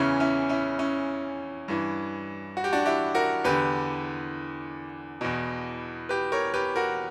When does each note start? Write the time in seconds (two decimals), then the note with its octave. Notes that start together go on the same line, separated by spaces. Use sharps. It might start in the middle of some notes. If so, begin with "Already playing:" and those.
Already playing: E2 C#3 E3 C#4 E4
0.20 C#4 E4
0.49 C#4 E4
0.79 C#4 E4
1.68 G2 E3
2.57 F#4
2.64 G4
2.73 D4 F#4
2.86 E4 G4
3.15 F#4 A#4
3.44 E2 D3 G4 B4
5.21 E2 B2
6.09 G4 B4
6.32 A#4 C#5
6.54 G4 B4
6.76 F#4 A#4